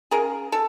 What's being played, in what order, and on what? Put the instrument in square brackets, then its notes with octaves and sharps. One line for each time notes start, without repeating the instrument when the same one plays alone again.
[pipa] C#3 G#4 A#4
A4